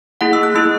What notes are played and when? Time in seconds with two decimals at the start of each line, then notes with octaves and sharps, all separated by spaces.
0.21 A#3 E4 G#4 F#5
0.33 E6
0.43 F#6
0.54 A#3 E4 G#4 E6